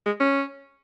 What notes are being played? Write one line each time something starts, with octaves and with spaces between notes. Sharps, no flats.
G#3
C#4